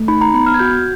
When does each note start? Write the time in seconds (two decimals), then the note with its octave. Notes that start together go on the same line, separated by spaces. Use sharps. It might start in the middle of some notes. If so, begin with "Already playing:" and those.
Already playing: A3
0.08 D#4 B5
0.21 A#5
0.34 B3 B5
0.46 F6
0.54 G#6
0.59 F#4 G6